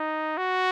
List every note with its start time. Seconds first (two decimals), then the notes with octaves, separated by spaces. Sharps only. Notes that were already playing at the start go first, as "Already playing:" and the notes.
Already playing: D#4
0.37 F#4